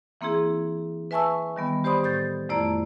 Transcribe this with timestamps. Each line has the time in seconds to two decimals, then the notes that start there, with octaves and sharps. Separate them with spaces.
0.21 E3 A#3 C4 E4 G#4
1.11 B4 E5 G#5 A5 C#6 E6
1.56 D#3 G3 B3
1.84 G4 C5 D5 B5 C6 D#6
2.03 A2 G6 A6
2.49 F2 A3 E4 D5 A#5